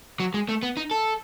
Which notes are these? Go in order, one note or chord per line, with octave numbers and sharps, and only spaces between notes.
F#3
G#3
A3
B3
D#4
A4